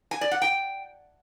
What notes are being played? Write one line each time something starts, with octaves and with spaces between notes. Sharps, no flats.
G#5
D5
F#5
G5